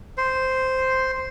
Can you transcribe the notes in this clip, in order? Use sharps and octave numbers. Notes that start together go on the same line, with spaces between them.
C5